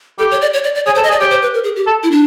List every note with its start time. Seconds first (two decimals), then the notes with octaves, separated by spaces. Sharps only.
0.19 G4 A4
0.31 C#5
0.41 D5
0.54 C#5
0.64 D5
0.75 D5
0.86 G#4 C#5
0.95 A4 C5
1.03 D#5
1.09 G#4
1.12 D5
1.20 G4 C#5
1.30 C5
1.42 B4
1.54 A#4
1.64 G#4
1.76 G4
1.87 A4
2.03 E4
2.11 D4